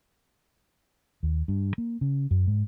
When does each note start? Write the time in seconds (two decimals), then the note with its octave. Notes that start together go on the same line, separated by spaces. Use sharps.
1.23 D#2
1.48 G2
1.78 A#3
2.01 C#3
2.31 F#2
2.47 G#2